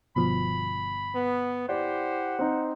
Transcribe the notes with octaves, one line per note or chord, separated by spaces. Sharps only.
G1 B2 F3 B5
B3
E4 G4 C5 D5 F#5
C4 D#4